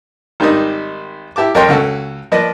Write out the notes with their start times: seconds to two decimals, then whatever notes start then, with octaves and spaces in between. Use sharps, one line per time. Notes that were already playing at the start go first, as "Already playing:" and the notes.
0.40 G#1 D#3 G3 D#4 D#6
1.36 E4 G4 A5 D6
1.55 F2 A#4 C#5 D#5 G5 C6
1.69 C#2 C#4 F#4 A4
2.32 F3 A#3 B4 D5 D#5